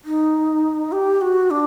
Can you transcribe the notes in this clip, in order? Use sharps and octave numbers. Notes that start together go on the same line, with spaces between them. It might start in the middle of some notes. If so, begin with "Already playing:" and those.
D#4
G4
F#4
D4